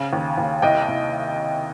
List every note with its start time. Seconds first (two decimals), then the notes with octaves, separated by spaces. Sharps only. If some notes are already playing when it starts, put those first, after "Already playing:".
Already playing: C#3
0.13 D#2
0.38 D#2
0.62 C2 D#5 G5
0.88 C2